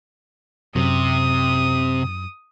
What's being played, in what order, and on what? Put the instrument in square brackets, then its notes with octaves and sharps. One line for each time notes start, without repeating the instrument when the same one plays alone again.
[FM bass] F#2 [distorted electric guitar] C3 [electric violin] D#6